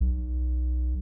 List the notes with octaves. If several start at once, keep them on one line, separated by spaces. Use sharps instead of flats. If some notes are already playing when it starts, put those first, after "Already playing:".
B1